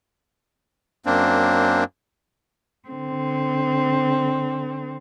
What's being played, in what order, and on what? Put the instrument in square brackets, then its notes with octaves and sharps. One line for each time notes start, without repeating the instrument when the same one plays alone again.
[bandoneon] F#2 A#3 C4 D4
[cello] D3 C4